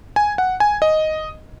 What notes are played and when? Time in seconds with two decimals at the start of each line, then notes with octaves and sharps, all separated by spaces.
0.16 G#5
0.38 F#5
0.60 G#5
0.82 D#5